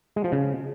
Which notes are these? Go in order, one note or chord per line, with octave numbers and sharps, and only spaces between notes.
G#3
F3
C#3